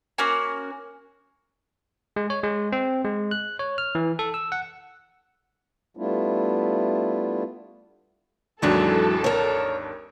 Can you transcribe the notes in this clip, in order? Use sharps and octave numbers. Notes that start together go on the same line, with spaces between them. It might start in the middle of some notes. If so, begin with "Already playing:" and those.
A#3 C#4 F#4 G#5
G#3
C#5
G#3
C4
G#3
F#6
C#5
F6
E3
A4
E6
F#5
G3 A3 B3 D4 E4 F4
G#1 D#2 E3 F#3 G#3 D4 A4
A#4 C#5